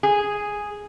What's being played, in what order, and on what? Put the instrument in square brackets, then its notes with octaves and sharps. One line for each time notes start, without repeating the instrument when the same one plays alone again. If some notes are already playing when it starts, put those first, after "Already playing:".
[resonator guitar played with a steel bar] G#4